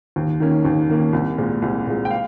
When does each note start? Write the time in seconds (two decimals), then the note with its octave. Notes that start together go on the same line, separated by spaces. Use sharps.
0.16 D#2
0.40 D#3 A#3 C#4
0.65 D#2
0.89 D#3 A#3 C#4
1.13 C2
1.38 A#2 G#3
1.62 C2
1.87 A#2 G#3
2.05 G5
2.11 F5